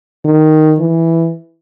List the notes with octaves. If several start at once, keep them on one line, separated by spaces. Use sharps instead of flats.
D#3
E3